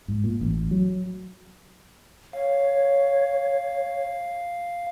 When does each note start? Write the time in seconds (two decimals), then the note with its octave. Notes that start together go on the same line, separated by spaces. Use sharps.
0.08 G#2
0.24 A#2
0.41 A1
0.71 F#3
2.33 C#5 F5